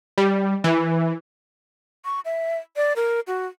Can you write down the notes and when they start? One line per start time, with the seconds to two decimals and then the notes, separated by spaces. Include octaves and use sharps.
0.18 G3
0.64 E3
2.05 C#6
2.25 E5
2.76 D5
2.96 A#4
3.27 F#4